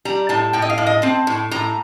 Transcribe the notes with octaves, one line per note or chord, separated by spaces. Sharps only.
G3 A#5
A2 A5
A2 G5
D#5
F5
A2
D#5
C4 A5
A2
A2 A#5